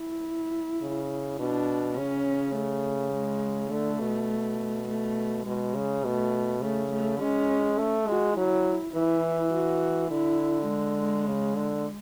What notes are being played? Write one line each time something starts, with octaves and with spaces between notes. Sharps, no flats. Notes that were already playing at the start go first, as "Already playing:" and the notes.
Already playing: E4
C#3
B2 D4
C#3 C#4
A3
G#3
D3 A3
B2
A3
B2 G#3
C#3
B2 A3
C#3 A3
A3
G#3 C#4
A3
G#3 F#4
F#3 E4
E3 E4
F#4
D3 E4
G#3
C#3
D3